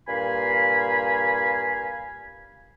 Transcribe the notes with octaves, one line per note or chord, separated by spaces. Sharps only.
G2 A#2 F5 G#5 B5